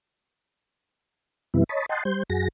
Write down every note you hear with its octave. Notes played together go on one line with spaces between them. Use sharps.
F#2 C3 E3 G3 B3 E4
C#5 D#5 A5 B5
D#5 F#5 G5 A5 C6
G3 C5 G6
F#2 F#4 G#4 A#6